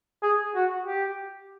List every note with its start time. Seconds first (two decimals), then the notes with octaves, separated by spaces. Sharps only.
0.23 G#4
0.55 F#4
0.86 G4